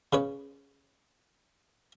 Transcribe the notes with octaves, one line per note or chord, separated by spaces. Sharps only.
C#3 B4 C#5